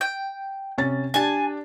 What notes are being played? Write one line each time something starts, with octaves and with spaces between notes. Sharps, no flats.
G5
C3 C#4 A6
D4 G4 G#5 A5